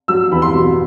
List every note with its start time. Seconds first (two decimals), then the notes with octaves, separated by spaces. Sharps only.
0.08 F#3 E6
0.32 E2 B5
0.42 C6
0.54 B2